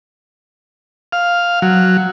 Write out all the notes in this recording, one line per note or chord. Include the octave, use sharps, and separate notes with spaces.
F5
F#3